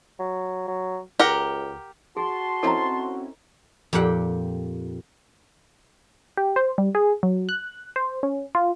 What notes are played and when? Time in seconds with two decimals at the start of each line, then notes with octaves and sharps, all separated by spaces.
0.19 F#3
0.68 F#3
1.19 C#2 G4 A#4 F#5
2.17 F#4 G#4 A5 C6
2.63 C4 C#4 E4 A4 D#5 A#5
3.93 F2 A#2 G4 F#5 G5
6.37 G4
6.56 C5
6.78 G3
6.95 G#4
7.23 F#3
7.49 F#6
7.96 C5
8.23 C#4
8.55 F4